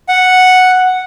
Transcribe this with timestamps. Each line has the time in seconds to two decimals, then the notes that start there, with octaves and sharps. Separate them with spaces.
0.09 F#5